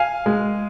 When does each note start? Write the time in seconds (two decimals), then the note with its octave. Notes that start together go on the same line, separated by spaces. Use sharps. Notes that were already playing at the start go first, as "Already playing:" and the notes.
Already playing: F5 G#5
0.26 G#3